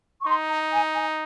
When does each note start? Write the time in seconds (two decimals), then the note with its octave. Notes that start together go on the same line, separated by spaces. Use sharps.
0.22 C#6
0.27 D#4 C6
0.50 A#5
0.73 G#5
0.96 G#5